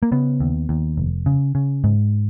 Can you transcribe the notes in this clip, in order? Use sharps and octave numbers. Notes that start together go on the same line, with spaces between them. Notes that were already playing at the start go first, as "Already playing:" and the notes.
A#3
C#3 B3
D#2
D#2
F1
C#3
C#3
G#2